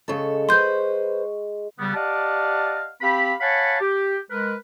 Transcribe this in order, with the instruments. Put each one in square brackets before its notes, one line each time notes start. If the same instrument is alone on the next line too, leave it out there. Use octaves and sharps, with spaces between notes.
[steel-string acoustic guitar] C#3 A4 [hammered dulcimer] G#3 C#6
[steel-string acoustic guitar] B4 C5 [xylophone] C6 G6
[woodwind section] C#3 G3 B3
G4 D5 D#5 F5 F#5 A5
C4 G4 F5 B5
C#5 F5 F#5 G#5 A5 B5
G4
G#3 A#4 B4